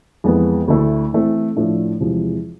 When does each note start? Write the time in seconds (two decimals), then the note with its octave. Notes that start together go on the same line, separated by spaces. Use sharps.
0.24 F2 E3 G#3 B3
0.68 D2 D3 A3 E4
1.13 E3 A3 C4
1.56 A2 F3 A3 D4
2.00 E2 C3 F3 G#3